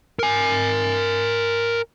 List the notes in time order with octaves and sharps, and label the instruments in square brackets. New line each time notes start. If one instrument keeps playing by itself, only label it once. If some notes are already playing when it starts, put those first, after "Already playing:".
[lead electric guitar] A#4 G#5